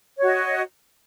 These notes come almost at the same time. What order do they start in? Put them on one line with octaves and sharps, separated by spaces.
C#5 F#4 D#5